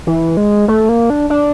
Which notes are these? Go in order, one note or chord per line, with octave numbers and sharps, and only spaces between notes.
E3
G#3
A3
A#3
D4
D4